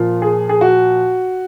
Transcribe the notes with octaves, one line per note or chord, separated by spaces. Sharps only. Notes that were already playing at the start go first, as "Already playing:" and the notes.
Already playing: A#2 F3 F4
G#4
G#4
F#4